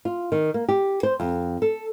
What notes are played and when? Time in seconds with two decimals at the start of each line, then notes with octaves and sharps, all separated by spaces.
0.05 F4
0.32 D#3
0.54 A#3
0.69 G4
1.03 C5
1.20 F2
1.62 A4